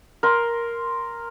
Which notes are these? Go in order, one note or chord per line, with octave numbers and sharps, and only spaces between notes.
A#4 C6